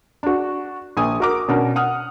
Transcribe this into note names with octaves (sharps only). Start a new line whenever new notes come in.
D4 F#4
A#1 G#5 D#6
F#4 A#4 D6
B2 C#4 D4 A#4
F#5 D#6 F6